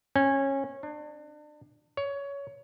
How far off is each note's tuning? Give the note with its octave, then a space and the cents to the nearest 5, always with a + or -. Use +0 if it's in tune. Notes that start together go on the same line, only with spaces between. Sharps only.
C#4 -20
D4 +35
C#5 +20